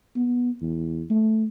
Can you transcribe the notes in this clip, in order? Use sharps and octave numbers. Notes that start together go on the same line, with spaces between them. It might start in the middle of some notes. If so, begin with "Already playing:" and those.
B3
E2
A3